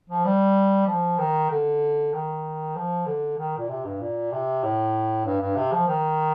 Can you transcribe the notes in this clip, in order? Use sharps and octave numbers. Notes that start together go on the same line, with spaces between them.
F3
G3
F3
D#3
D3
D#3
F3
D3
D#3
A#2
C3
G2
A#2
C3
A2
G2
G2
C3
F3
D#3